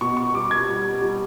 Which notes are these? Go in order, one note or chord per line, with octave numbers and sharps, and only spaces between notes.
B2 C#6
C#6
G3 D6
G#6
G3
G3